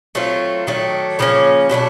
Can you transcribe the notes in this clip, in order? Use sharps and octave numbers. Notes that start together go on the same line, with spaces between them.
F#3 A3 C4 F4
D#3 F#3 A3 D4
C#3 F3 A#3 C#4
B2 F#3 A3 D4